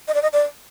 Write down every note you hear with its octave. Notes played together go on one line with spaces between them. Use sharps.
D#5
D5
D#5
D5